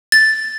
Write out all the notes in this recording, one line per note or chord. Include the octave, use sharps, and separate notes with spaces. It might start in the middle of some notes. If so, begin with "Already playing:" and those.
A6